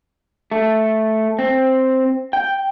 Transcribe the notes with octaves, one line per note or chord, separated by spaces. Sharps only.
A3
C4
G5